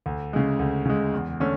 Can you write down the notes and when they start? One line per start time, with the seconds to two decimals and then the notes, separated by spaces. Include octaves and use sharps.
0.06 D2
0.33 C#3 G#3
0.59 D2
0.86 C#3 G#3
1.13 E2
1.40 D3 A3 C#4